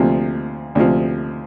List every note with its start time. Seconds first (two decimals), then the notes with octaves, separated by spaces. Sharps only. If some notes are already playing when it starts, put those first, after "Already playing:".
Already playing: D2 C3 F3
0.75 D2 C3 F3